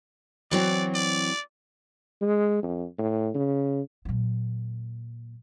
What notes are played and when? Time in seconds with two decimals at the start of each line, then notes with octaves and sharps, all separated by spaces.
0.51 E3 F#3 C4 D5
0.95 D5
2.21 G#3
2.63 F2
2.98 A2
3.34 C#3
4.05 A#2 F#3